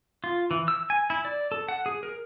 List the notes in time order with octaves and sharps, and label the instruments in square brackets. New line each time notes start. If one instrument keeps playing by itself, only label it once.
[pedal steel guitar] F4
E3
E6
G#5
E4
D5
A4
F#5
G#4
A#4